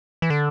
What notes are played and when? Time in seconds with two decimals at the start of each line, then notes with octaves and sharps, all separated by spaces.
0.22 E3
0.30 D3